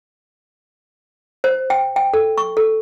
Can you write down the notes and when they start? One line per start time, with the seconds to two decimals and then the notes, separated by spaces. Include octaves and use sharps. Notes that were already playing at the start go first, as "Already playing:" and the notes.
1.44 C5
1.70 G5
1.96 G5
2.14 A4
2.38 C#6
2.57 A4